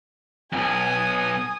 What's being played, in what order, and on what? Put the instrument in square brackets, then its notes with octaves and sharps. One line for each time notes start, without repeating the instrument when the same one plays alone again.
[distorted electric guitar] B1 F2 [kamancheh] G#5 D#6